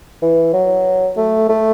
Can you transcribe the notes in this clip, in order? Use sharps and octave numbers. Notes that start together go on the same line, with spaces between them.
E3
F#3
A3
A3